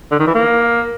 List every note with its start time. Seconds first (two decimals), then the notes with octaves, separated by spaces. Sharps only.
0.12 D3
0.20 D#3
0.27 E3
0.35 A#3